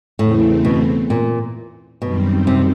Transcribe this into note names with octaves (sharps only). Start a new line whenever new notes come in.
E2 A2 C#3 E3 A3 C4
B2
A#2
F#2 B2 D#3 G3 C4
C3